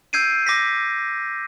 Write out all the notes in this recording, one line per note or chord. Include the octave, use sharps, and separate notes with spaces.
E6 G6 G#6 C7 D7 D#7
D6 A#6 B6